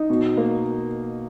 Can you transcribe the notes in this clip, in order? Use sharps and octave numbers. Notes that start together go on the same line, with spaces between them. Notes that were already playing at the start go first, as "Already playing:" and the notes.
Already playing: D#4
B2
A#3